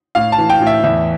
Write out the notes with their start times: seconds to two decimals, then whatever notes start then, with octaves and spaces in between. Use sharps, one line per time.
0.15 A2 F5
0.32 A5
0.38 E3
0.50 G5
0.61 A2
0.67 E5
0.84 E2 E5